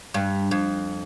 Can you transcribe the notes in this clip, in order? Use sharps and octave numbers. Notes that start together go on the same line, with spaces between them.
G2
F2